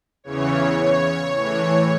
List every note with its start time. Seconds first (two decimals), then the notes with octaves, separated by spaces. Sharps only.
0.24 E2 C#3 E3 C#5
0.79 C#5
1.34 A2 E3 C#5